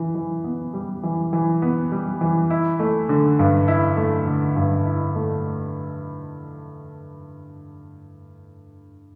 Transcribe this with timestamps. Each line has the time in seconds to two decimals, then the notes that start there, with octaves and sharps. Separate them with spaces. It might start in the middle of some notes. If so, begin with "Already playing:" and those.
Already playing: E3
0.15 E3
0.44 B3
0.74 G3
1.03 E3
1.33 E3
1.62 B3
1.92 G3
2.21 E3
2.50 E4
2.79 A3
3.09 D3
3.39 G2
3.68 E4
3.97 A3
4.26 D3
4.56 G2
4.86 E4
5.15 A3